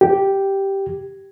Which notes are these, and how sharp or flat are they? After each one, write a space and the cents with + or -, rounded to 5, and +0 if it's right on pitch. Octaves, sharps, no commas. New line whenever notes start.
G4 -5